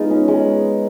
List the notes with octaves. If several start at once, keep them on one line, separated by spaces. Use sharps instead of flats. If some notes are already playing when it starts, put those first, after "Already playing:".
Already playing: G#3 B3 D#4 F4
C#4
G#3